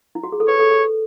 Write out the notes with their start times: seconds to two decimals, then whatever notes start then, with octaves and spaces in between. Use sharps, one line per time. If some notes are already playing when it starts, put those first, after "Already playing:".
0.15 E4
0.23 F#4
0.32 G#4
0.40 A4
0.48 B4 C#5
0.59 A4
0.71 A4